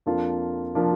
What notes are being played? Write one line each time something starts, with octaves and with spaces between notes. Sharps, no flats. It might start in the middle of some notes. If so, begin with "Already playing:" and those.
F2 F3 A#3 D4 F4
F3 A#3 D4 F4